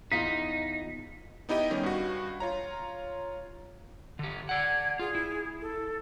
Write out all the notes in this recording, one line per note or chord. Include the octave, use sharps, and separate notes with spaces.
E2 D#4 F4 D#5 B6
B3 D#4 E4 G4 D#5
D#3 G3 C#4
G2 F#4
F4 C#5 A#5
D3 G4
D5 F#5 G#6
F4 G#4
E4
A4